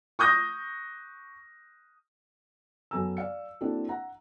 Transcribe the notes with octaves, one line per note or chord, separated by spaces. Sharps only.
C#6 D#6 G6 A#6
F#2 B3 A4 G#5 A#5 E6
D5 F5 C#7
A#3 C4 D4 E4 F#4 A4
E5 F#5 A#5